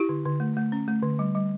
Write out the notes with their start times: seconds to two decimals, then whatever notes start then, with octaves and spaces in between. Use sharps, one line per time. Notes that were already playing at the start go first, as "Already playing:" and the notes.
Already playing: E4 G4
0.09 D3
0.25 D3
0.40 A3
0.57 A3
0.72 C#4
0.88 A3
1.03 D3
1.19 G3
1.35 G3